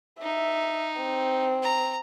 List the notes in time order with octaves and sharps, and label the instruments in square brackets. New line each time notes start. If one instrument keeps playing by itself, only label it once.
[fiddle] D#4 [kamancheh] E5
[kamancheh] C4
[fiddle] A#5